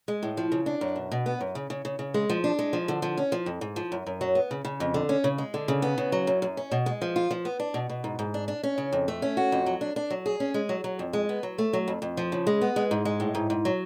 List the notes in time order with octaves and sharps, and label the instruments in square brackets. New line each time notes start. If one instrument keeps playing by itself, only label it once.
[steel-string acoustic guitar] G#3
A2
F3
C#3
D4
F#2
B2
B2
B3
F#2
C#3
C#3
C#3
C#3
G#3
F3
D4
G#3
F3
D3
F3
C#4
F3
F2
G#2
F3
F#2
F#2
F#3
B3
C#3
C#3
F2
D3
C#4
C#3
G#3
D3
C#3
B3
C#3
F#3
F#2
F#2
C#4
B2
G#3
F3
F4
F3
B3
D4
B2
B2
G#2
G#2
D4
D4
C#4
C#3
F2
A3
C#4
F#4
F2
F#3
D4
D4
F#3
G#4
C#4
G#3
F#3
F#3
F2
G#3
B3
F#3
A3
F#3
F2
F2
F3
C#3
G#3
B3
G#3
G#2
G#3
A2
G#2
G#2
F#3